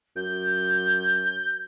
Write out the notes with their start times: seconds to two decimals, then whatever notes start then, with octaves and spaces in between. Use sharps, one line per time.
0.16 F#2 G6